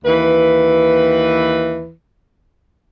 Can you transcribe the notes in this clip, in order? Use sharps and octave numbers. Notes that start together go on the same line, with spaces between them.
D#2 E3 B4